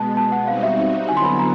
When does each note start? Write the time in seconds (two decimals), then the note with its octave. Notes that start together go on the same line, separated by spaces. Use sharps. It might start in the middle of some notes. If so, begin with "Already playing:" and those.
Already playing: B2 G#3 B3 A5
0.17 A5
0.32 F#5
0.47 G3 C4 D#4 F#4 F5
0.63 E5
0.77 E5
1.09 D3 F#3 B3 E4 G#5
1.17 C6
1.24 B5
1.39 A#5